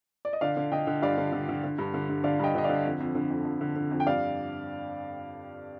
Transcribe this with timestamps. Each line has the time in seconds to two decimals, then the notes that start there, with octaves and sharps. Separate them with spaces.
0.25 D5
0.33 D#5
0.41 D3 D5 F5
0.56 D3
0.72 D3 D#5 G5
0.87 D3
1.02 G2 D5 F5
1.18 D3
1.32 D3
1.49 D3
1.64 D3
1.78 G2
1.94 D3
2.09 G2
2.24 D3 D5 F5
2.39 G2 D#5 G5
2.55 D3 D#5
2.64 D5 F5
2.69 D3
2.85 F2
3.00 F2
3.15 D3
3.30 F2
3.45 F2
3.61 D3
3.76 D3
3.91 F2
4.00 G5
4.06 G2 D5 F5